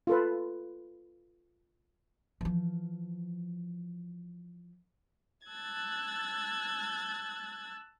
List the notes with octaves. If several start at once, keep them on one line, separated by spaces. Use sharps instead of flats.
F4 A4 B4
E3 F3
A5 E6 F#6 G#6 A6